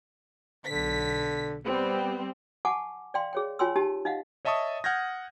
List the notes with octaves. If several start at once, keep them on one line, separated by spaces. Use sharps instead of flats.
B1 D3 B6
G3 B3 C4
F#5 G#5 A5 C#6 D6
D5 F5 G5 C6
G#4 C#5 G5
F4 C#5 G5 G#5 C6 E6
D#4 G4 A5
D#4 D#5 F5 F#5
C#5 D#5 E5 A5 C#6 D#6
F#5 F6 G6 G#6 A#6